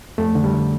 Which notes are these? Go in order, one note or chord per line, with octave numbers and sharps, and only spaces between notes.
F2 A3
D3
G3